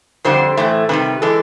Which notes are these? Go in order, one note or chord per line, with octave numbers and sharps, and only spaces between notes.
F2 D3 G3 C5
A2 E3 A3
C3 D#3 G3 B4
E3 G#3 A4